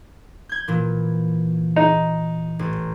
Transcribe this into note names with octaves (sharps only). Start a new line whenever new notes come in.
G6 G#6
A#2 E3
D#4
A1